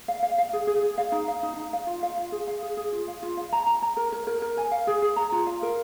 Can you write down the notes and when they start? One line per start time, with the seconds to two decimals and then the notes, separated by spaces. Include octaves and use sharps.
0.08 F5
0.23 F5
0.38 F5
0.53 G#4
0.67 G#4
0.83 G#4
0.98 F5
1.12 D#4
1.28 F5
1.43 D#4
1.57 D#4
1.73 F5
1.87 F4
2.03 F5
2.17 F4
2.32 G#4
2.47 F5
2.62 G#4
2.77 G#4
2.92 F4
3.08 F5
3.23 F4
3.37 F5
3.52 A#5
3.67 A#5
3.82 A#5
3.97 A#4
4.12 A#4
4.27 A#4
4.42 A#4
4.57 G#5
4.71 F5
4.87 G#4
5.02 G#4
5.16 A#5
5.32 F4
5.46 F5
5.62 A#4